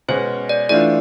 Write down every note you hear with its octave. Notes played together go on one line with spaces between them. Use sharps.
B2 G#3 C#4 C5
D5
E3 A3 D4 F4 D5